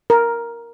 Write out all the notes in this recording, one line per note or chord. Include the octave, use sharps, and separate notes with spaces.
A#4